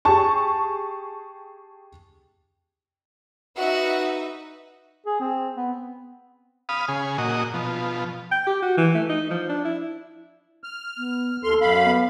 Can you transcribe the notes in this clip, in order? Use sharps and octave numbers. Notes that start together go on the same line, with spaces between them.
G4 G#4 A5 C#6
D#4 F#4 B4 E5 F#5
G#4
C4
B3
F5 B5 D#6
C#3 G#4
A#2 F#4 D#5
B2 F3
G5
G4
F#4
E3
A3
D#4
F3
D4
E4
F6
B3
D#2 A4 C6 F6
F#2 F5 B5
B3